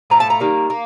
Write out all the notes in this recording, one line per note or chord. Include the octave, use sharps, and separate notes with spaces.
A2 F3 A3 A#5
A5
A#5
D#3 G3 A#3
A#3